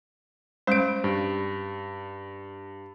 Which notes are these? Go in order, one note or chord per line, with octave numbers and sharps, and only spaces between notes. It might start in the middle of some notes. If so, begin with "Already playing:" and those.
G3 G#3 C#4 C5 D7
G2